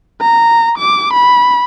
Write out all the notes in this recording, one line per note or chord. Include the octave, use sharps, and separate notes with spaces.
A#5
D6
B5